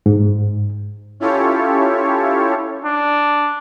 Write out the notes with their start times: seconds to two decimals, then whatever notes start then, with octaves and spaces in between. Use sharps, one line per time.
0.06 G#2
1.20 C#4 E4 F4 G4 A4 C#5
2.85 D4